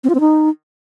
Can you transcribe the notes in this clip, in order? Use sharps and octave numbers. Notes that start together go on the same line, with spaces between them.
C4
F4
C4
D#4